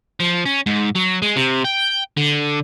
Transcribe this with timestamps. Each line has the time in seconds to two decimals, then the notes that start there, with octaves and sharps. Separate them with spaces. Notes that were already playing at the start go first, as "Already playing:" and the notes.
0.20 F3
0.46 C#4
0.66 G#2
0.95 F#3
1.22 G#3
1.36 C3
1.65 G5
2.17 D3